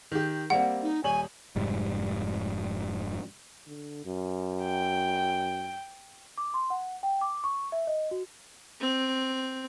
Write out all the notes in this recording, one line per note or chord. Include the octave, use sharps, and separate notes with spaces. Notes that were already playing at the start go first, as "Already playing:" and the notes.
D#3 G4
G3 A#3 C4 F#5
D#4
D#1 C#5 G#5 F#7
F1 G#2 G3
D3
F#2
G5
D6
C6
F#5
G5
D6
C#6
E5
D#5
F#4
C4